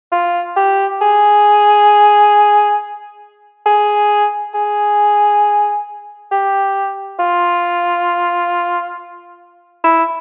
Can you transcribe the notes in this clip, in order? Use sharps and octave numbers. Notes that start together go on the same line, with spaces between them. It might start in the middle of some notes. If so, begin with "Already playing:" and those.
F4
G4
G#4
G#4
G#4
G4
F4
E4